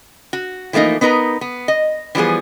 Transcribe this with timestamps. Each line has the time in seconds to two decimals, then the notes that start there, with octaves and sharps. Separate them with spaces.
0.33 F#4
0.73 E3 F3 A3 A#3 D#4
1.01 B3 D#4 A#4 B4 A#5
1.41 B3
1.68 D#5
2.15 E3 F3 G3 B3 G#4